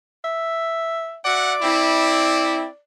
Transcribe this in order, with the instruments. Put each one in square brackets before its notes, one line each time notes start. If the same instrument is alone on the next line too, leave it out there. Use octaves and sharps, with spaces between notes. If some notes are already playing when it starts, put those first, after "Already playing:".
[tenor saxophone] E5
[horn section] F#4 E5 F#5 [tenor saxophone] D5
[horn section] C4 E4